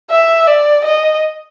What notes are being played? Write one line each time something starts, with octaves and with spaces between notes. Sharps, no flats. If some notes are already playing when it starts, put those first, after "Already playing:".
E5
D5
D#5